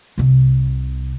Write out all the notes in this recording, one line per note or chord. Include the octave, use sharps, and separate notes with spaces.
C2 C3